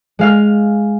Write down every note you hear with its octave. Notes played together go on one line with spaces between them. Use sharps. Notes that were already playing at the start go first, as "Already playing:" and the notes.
G#3 F5 F6